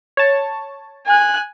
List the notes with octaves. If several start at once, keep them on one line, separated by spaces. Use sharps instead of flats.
C#5 A5
G#5 F#6